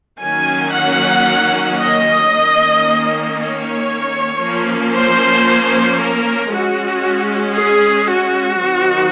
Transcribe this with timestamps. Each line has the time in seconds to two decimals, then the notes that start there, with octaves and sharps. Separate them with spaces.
0.21 D#3 F#3 A#3 C#4 G#5
0.74 F#5
1.79 D#5
2.31 D#3 A#3 C#4
3.36 C#5
4.41 F3 A#3 C#4
4.93 C5
5.99 A#4
6.51 G#3 C#4 F#4
7.56 G#4
8.09 F#4
8.62 D#3 F#3 C4 D#4